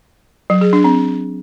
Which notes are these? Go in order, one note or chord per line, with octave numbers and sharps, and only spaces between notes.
F#3
G#4
D4
C4